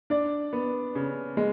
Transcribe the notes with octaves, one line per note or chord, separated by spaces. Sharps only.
D4 D5
B3
C#3
G#3